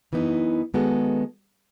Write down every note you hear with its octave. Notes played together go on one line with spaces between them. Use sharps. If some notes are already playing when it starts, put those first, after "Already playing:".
F#2 E3 B3 D#4
D#3 G#3 B3 F#4 A4